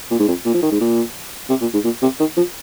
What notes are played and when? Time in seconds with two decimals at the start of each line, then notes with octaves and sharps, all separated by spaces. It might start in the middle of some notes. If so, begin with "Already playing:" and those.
0.11 A#2
0.19 G#2
0.28 F2
0.46 A#2
0.54 F3
0.62 D#3
0.71 G#2
0.81 A#2
1.49 C3
1.61 A#2
1.73 G#2
1.84 A#2
2.02 C3
2.20 D#3
2.37 F3